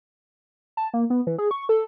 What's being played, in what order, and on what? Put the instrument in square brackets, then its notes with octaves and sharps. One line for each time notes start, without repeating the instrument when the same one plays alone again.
[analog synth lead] A5
A#3
B3
E3
G#4
C#6
A4